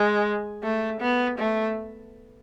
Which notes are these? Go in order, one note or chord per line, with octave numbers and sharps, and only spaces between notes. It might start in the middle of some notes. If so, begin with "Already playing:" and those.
Already playing: G#3
A3
B3
A3